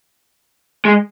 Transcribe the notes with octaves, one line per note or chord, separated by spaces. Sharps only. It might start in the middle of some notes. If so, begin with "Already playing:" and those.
G#3